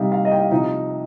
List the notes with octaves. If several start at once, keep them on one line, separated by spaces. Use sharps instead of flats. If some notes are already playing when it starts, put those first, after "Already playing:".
Already playing: C3 G3 D#4 F5
F5
D#5
G5
F5
C3 F3 D#4